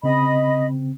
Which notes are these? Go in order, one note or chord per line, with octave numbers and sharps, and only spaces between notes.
C#3 C4 D#5 B5